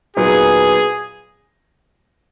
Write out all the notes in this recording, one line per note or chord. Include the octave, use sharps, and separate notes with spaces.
A#2 F#3 B3 D#4 G#4